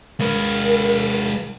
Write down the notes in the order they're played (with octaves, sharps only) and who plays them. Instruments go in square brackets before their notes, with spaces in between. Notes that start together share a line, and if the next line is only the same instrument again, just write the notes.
[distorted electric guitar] G#3 B4 [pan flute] A#4